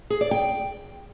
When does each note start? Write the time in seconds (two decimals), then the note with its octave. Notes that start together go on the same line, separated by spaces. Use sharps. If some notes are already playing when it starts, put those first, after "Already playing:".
0.10 G#4
0.21 D5
0.31 G5